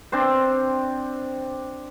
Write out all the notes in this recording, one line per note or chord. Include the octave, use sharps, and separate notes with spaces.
C4 D4 C5